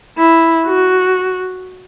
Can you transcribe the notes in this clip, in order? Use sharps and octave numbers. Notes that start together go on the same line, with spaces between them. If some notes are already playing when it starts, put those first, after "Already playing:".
E4
F#4